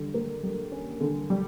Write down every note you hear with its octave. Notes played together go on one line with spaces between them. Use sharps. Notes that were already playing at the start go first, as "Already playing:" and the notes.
Already playing: D3 G3
A#3
G3
C#4
D3
G3